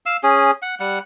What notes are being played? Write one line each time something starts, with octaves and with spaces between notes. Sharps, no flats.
F5 E6
C#4 G#4
F#5
G3 F#5